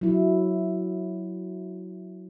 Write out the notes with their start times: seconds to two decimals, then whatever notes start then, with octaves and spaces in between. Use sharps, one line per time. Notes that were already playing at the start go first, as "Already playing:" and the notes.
0.01 F#3 E4